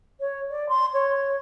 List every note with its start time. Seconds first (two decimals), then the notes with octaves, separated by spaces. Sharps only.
0.20 C#5
0.50 D5
0.68 C6
0.93 C#5